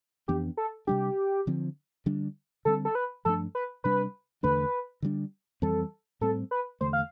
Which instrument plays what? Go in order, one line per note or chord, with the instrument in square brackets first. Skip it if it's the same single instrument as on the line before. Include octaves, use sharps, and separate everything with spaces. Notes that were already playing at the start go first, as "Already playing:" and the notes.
[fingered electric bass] F2 E3 B3 D4 [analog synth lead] G4
[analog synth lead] A4
[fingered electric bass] C3 G3 D4 [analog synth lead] G4
[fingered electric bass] D3 F3 C4
D3 G3 D4
[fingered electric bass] D3 G3 C4 [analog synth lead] A4
[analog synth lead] A4
B4
[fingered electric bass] G2 F3 A3 D4 [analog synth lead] A4
[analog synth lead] B4
[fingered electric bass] C3 G3 D4 [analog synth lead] B4
[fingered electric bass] E2 D3 A3 D4 [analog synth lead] B4
[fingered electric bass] D3 G3 D4
[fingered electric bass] F2 E3 G3 C4 [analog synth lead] A4
[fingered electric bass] A2 G3 C4 [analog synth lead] A4
[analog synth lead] B4
[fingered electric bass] E2 D3 A3 [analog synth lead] C5
[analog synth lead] F5